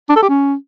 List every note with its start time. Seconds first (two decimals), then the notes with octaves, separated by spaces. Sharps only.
0.10 D4
0.16 A4
0.23 G4
0.29 C#4